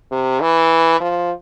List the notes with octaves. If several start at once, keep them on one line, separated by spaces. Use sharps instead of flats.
C3
E3
F3